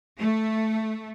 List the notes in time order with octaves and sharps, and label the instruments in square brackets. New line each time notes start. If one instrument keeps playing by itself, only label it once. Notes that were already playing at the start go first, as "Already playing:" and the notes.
[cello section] A3